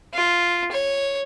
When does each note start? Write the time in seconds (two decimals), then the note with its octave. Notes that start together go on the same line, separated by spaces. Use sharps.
0.14 F4
0.72 C#5